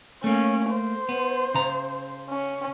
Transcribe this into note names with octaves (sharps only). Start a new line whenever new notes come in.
A3 A#3 C#4
C5
B3
C#3 A#5
C#4